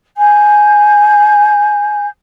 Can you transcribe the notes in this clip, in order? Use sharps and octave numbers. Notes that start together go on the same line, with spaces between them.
G#5 G6